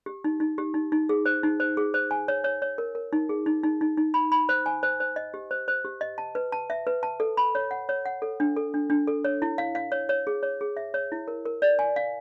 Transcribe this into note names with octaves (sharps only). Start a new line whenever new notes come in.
G4
D#4
D#4
G4
D#4
D#4
G#4
C5
D#4
C5
G#4
C5
G#5
C#5
C#5
C#5
A#4
A#4
D#4
G#4
D#4
D#4
D#4
D#4
B5
B5
C5
G#5
C5
C5
D#5
G4
C5
C5
G4
D#5
A5
B4
A5
E5
B4
A5
A4
B5
C#5
F#5
C#5
F#5
A4
D4
A4
D4
D4
A4
C#5
E4
F5
F5
C#5
C#5
G#4
C#5
G#4
E5
C#5
E4
A#4
A#4
D5
G#5
F5